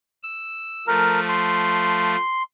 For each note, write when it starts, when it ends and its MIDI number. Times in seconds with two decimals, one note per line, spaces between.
0.23 0.86 88
0.87 2.16 53
0.87 2.16 57
0.87 1.20 70
1.29 2.43 84